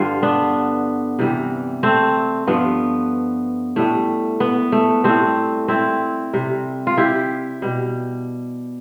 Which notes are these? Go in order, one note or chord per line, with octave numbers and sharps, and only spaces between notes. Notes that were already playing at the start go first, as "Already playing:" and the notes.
Already playing: G2 D3 G3 F4
B3 D4
C3 E3 G3
A3 C4
G2 F3 A3 B3
A2 G3 A3
B3
A3
A2 G3 A3 C4
C4 E4
C3 G3
F4
E4 G4
B2 G3